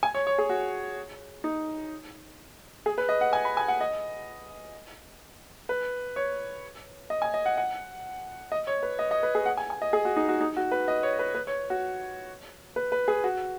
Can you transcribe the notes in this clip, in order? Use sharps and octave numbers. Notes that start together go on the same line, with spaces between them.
G#5
C#5
C#5
G#4
F#4
D#4
G#4
B4
D#5
F#5
G#5
B5
G#5
F#5
D#5
B4
C#5
D#5
G#5
D#5
F#5
F#5
D#5
C#5
B4
D#5
D#5
B4
G#4
F#5
G#5
G#5
D#5
G#4
F#4
D#4
F#4
D#4
F#4
B4
D#5
C#5
B4
B4
C#5
F#4
B4
B4
G#4
F#4